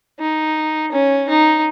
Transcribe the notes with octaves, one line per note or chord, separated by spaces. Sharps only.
D#4
C#4
D#4